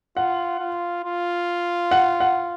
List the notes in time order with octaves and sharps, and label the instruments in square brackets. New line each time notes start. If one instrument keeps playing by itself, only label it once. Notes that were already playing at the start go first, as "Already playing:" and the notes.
[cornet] F4 [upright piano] F#5
[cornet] F4
F4
[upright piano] F#5
F#5